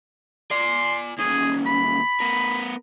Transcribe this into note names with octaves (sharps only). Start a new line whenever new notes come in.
D5 G#5 C6
D#2 C#4 G#4
B5
B3 A#4